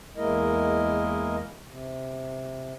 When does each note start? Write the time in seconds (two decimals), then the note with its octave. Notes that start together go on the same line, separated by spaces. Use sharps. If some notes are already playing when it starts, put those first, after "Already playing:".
0.17 E2 G#3 A#3 E4 A#4 D#5
1.67 C3